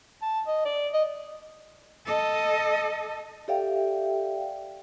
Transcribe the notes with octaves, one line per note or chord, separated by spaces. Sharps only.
A5
D#5
D5
D#5
A4 D#5
G4 A4 D5 E5 F5 G5